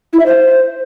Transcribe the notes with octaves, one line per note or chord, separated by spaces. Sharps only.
E4
E5
C5